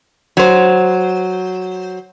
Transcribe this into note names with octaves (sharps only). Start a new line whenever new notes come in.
F#3 C5